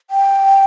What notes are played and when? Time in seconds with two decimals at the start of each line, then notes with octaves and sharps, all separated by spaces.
0.10 G5